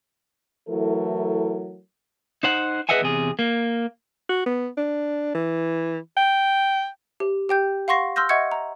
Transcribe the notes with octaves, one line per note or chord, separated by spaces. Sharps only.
E3 F#3 A3 E4 A4 A#4
D#4 C5 F#5
G#4 B4 D#5 E5 F#5 G#5
E2 C3 G#4
A#3
F#4
B3
D4
E3
G5
G4
G4 G5 G6
F5 F#5 C6 C#6 A#6 C7
C6 E6 F6 G6 A#6
D#5 E5 F#5 C#6 G#6 C#7
A#5